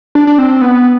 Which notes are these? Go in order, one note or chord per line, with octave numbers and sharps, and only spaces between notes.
D4
D4
C4
B3